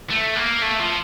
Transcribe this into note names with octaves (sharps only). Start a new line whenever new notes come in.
A3
A#3
A3
F3